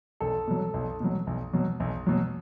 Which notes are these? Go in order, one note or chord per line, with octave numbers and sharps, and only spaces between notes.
B1 A4
B2 F#3
B1
B2 F#3
B1
B2 F#3
B1
B2 F#3